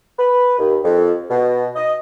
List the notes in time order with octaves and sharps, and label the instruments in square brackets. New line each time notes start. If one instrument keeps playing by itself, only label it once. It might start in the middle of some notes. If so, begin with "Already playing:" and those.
[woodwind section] B4
D#2
F2
B2
D#5